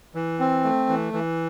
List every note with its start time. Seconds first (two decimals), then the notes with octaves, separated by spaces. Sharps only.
0.15 E3
0.40 C4
0.64 A3
0.89 E3
1.14 E3